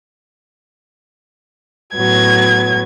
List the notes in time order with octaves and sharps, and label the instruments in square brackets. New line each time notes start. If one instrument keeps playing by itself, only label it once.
[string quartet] A2 F#3 B3 [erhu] G#6